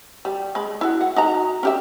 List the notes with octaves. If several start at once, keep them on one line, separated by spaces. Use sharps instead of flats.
G3
G#3 B5
E4 F#4
F#5
D#4 F#4 A#5
C#4 G4 E5